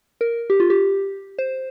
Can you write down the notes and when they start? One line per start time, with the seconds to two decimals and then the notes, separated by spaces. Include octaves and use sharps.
0.21 A#4
0.50 G4
0.60 F4
0.70 G4
1.39 C5